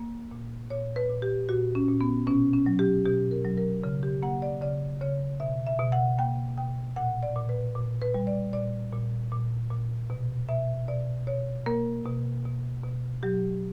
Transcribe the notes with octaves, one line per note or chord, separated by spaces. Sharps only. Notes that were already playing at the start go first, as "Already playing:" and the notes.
Already playing: A#3
A#2
A#2 C#5
B4
A#2
G4
A#2 F#4
C#4
A#2
B3
B2 C#4
C#4
F#3
G4
B2 G4
A#4
F#3
A#4
C#3
G4
A#3 F#5
D5
C#3 D5
C#3 C#5
B2 E5
E5
B2
F#5
A#3 G5
B2 G5
A#2 F#5
D5
A#2
B4
A#2
B4
G3
D5
A#2 D5
A#2
A#2
A#2
B2
B2 E5
B2 D5
B2 C#5
A#3 A#4
B2
B2
B2
F#3 G4